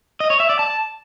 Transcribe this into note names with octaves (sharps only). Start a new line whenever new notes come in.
D#5
C#5
E5
D5
A5